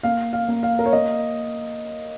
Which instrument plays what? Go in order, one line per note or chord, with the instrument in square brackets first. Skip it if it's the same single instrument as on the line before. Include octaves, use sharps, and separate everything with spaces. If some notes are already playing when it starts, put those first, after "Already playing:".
[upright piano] A#3 F5
F5
A#3
F5
A#4
C#5
A#3 D#5